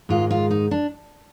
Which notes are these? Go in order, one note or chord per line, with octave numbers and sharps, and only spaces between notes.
G#2 D#3 G#3 F4
F4
D#4
D4